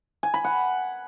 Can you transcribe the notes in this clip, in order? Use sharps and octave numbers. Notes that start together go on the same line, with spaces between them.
G#5
B5
F#5